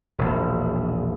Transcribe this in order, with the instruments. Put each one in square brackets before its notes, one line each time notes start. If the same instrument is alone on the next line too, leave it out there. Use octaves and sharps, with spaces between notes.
[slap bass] E1 A#1